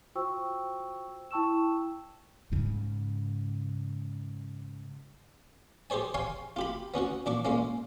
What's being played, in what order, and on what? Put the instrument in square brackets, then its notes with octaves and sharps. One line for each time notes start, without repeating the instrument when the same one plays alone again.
[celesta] F4 F#4 C5 G5 C#6 E6
E4 G5 A5 C#6 E6 E7
[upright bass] G#2 C#3
[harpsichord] G4 G#4 C5 C#5 G#5
C#5 F5 G#5 C6 C#6
F4 G4 B5
B3 C#4 F#4 F#5
A#2 D4 C#6 D6
A#2 G#3 A#3 C#4